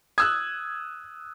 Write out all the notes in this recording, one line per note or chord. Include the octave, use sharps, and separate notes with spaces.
D#6 E6 F#6 G#6